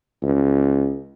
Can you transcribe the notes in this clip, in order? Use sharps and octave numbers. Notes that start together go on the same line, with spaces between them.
C#2